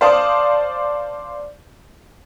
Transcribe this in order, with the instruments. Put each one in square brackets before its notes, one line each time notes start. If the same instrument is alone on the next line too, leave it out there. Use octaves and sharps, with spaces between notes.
[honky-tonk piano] C5 D5 F5 A5 D6 D#6